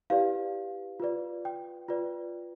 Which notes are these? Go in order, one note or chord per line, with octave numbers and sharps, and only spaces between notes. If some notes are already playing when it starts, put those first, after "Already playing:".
E4 G4 B4 D5 F5
F4 B4 D5
G5
F4 B4 D5